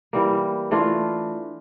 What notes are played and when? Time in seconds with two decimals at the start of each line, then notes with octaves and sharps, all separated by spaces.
0.13 E3 G3 A#3
0.71 E3 A3 D4 F4